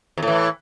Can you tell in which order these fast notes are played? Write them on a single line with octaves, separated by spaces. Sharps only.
E2 A2 E3